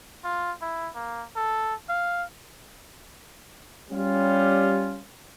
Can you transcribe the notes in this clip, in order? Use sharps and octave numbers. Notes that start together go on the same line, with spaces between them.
F4
E4
A#3
A4
F5
G3 C#4 F4